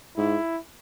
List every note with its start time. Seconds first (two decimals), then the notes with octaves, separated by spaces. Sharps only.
0.17 G#2 E4